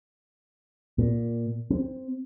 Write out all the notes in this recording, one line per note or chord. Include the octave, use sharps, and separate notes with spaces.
A#2
C4